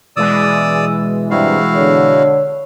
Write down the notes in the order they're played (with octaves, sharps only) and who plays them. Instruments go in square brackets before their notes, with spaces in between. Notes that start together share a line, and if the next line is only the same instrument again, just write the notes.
[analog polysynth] B2 E3 G#3 [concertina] D5 D#6 E6
[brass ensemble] G2 C3 [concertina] E4 F#4 F5
[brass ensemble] D3 C#5